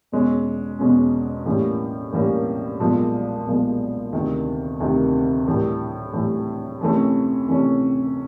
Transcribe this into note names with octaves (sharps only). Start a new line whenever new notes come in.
E2 B2 G#3 C#4
E2 B2 G#3 C#4
A2 E3 G3 A#3 C#4
A2 E3 G3 A#3 C#4
B1 A#2 F3 G#3
B1 A#2 F3 G#3
D2 C3 D#3
D2 C3 D#3
A2 E3 G3
A2 E3 G3
F2 C3 E3 A3 C#4
F2 C3 E3 A3 C#4